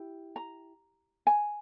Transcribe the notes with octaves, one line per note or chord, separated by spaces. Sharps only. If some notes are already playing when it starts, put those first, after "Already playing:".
Already playing: E4 G4
A#5
G#5